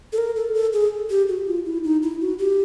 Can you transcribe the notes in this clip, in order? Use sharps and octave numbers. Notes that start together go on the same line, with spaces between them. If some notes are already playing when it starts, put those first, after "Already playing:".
A4
A#4
A4
A4
G#4
G4
F#4
F4
E4
D#4
E4
F#4
G4